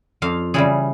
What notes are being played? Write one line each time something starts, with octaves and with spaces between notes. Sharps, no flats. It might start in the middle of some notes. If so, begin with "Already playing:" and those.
F2 F5
C#3 E3 G3 G#4